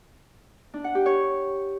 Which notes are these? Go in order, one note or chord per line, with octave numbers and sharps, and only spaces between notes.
D4
F#5
G4
C#5